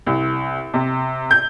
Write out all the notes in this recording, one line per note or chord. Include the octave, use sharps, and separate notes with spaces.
C2
C3
G6